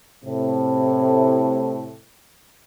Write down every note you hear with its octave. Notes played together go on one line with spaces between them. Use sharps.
A2 C3